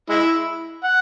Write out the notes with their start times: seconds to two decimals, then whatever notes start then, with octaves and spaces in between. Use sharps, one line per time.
0.09 G#3 E4
0.84 F#5